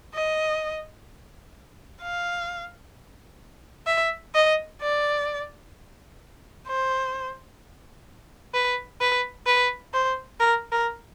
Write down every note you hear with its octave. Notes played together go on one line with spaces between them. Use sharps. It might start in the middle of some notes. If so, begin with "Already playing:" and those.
D#5
F5
E5
D#5
D5
C5
B4
B4
B4
C5
A#4
A#4